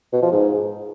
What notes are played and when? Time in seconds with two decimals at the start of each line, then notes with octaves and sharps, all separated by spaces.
0.13 B2
0.22 F3
0.32 G#2